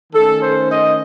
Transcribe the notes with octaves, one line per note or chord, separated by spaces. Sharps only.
D#3 A3 C#4 A4
C5
D#5